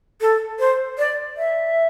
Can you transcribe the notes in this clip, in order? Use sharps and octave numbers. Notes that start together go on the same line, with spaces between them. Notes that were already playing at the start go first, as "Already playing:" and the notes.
A4
C5
D5
E5